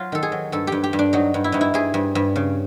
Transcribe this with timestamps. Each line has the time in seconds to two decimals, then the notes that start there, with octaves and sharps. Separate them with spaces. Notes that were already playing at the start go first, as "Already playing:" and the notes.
Already playing: F#3 F4
0.12 D#3 A4
0.23 G#4
0.32 F#3
0.52 G2 A4
0.67 G2 G4
0.84 G4
0.93 G2
0.99 D4
1.13 F#3 D#4
1.34 G2
1.44 E4
1.52 G2 D#4
1.61 E4
1.74 G2 G#4
1.94 G2
2.15 G2
2.36 C#3